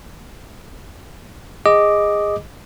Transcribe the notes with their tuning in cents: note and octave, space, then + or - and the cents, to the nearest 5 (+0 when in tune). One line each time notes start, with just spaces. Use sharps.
G#4 -20 D#5 +0 D6 +0